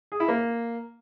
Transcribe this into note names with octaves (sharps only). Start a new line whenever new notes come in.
G#4
E4
A#3